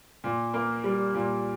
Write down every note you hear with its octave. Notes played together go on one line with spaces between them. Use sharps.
A#2
A#3
G3
A#2